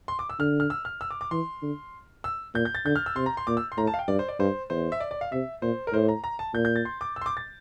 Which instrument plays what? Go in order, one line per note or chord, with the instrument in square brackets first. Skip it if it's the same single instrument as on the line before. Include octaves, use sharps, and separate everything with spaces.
[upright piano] C6
D6
E6
[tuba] D3 [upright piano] F6
[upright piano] F6
E6
F6
E6
D6
D6
[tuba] E3 [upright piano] C6
[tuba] D3
[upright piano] E6
[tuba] A#2 [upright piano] G6
[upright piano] G6
A6
[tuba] D3 [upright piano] G6
[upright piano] F6
E6
[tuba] C3 [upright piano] C6
[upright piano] A#5
C6
[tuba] A#2 [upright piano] D6
[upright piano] E6
C6
[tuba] A2 [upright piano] A#5
[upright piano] A5
F5
G5
[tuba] G2 [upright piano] D5
[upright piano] C5
D5
[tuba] G2 [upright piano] C5
[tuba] E2 [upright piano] C5
[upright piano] E5
D5
D5
F5
[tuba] C3 [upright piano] E5
[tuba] A#2 [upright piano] C5
[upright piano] A#4
[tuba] A2 [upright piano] C5
[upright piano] A#5
A#5
A5
[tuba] A#2 [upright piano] G6
[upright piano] G6
A6
C6
D6
E6
C6
D6
A6